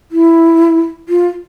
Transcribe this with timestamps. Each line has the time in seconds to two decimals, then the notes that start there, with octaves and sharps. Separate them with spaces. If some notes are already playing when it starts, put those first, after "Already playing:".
0.12 E4
1.09 F4